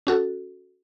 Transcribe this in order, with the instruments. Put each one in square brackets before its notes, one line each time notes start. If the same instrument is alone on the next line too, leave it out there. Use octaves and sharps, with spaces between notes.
[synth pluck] C#4 F#4 A4